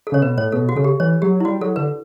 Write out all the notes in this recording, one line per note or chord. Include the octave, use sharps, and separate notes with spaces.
A4
C#3 C#5
B2 B4
A2 C#5
B2 A4
F#4
C#3 A4
G4
E3 C#5
F#3 G4
E4
G3 F#4
F#3 A4
D3 B4